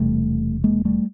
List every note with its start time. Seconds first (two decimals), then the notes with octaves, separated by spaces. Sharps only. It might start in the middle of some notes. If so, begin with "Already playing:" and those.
Already playing: E1 E2 C3 G3 A3
0.64 G#3 A#3
0.85 G3 A3